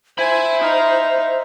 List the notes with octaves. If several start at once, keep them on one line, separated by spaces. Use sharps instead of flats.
C5 E5 G#5 B5
D#4 F5